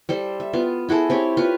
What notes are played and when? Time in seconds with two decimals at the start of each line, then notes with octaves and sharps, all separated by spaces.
0.09 G3 A4 C5
0.40 E5
0.53 B3 F4
0.89 E4 F#4 G#4 A4
1.10 C4 G4 C#5
1.37 F4 B4 C#5